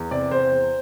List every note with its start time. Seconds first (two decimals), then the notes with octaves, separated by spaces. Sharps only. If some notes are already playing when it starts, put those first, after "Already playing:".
Already playing: E2
0.11 C3 D5
0.31 E2 C5
0.52 E2